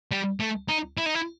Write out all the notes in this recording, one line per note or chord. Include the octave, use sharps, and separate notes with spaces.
G3
A3
D#4
E4
D#4
E4